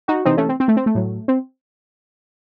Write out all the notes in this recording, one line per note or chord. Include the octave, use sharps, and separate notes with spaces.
D#4 F#4
C3 E3 C4 D#4
A3 C#4
C4
C4
A3
C4
A3
A2 F#3
C4